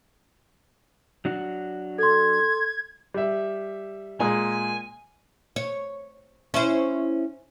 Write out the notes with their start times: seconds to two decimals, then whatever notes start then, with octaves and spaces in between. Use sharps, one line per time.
1.25 F#3 D4 F#4
1.99 A4 C6 G#6
3.14 G3 E5
4.20 A#2 G#3 G#5 A#5
5.56 C#5
6.54 C#4 E4 C5